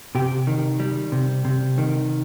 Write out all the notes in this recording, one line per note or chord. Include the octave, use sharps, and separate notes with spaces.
C3 G4
D#3
G3
C3
C3
D#3